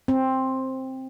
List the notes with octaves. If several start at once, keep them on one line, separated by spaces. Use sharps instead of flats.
C4